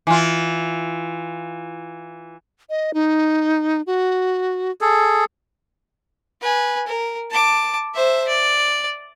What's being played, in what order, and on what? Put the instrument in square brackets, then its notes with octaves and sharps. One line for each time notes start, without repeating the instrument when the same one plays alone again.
[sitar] E3 F4
[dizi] D#5
D#4
F#4
[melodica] G#4 A4
[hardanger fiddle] B4 G#5
A#4
A5 D6
C5 E5
D5